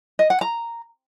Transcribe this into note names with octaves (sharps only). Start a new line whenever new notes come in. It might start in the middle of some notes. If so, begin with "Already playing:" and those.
D#5
F#5
A#5